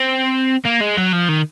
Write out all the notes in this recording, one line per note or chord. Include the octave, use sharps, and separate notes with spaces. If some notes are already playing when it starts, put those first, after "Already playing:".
Already playing: C4
A#3
G#3
F#3
F3
D#3